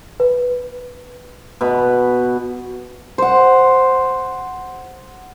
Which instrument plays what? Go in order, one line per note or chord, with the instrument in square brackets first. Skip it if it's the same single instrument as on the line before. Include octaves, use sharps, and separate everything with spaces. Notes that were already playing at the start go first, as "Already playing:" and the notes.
[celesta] B4
[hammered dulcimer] B2 B4
C5 F#5